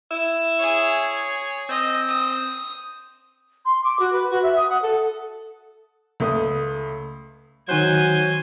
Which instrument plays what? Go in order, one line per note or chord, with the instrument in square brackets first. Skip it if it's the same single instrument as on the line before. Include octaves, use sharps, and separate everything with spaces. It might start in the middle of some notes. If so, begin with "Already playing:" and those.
[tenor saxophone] E4
[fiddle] G#4 C#5
[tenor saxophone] C4 [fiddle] D#5
[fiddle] D#6
[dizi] C6
D6
F#4
B4
F#4
E5
D#6
F#5
A4
[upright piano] C#2 A3 D#6
[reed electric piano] D#3 D#4 F#6 [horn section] F#3 [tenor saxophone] C5 [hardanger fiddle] G#5